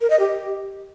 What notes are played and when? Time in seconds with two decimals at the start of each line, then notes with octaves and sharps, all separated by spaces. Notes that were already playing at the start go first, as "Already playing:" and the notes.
0.01 A#4
0.10 D#5
0.19 G4